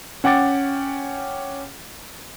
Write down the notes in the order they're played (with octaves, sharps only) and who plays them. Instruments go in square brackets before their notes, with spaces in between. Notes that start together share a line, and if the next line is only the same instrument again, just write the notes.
[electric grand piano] C#4 F#5 G5 D6 A6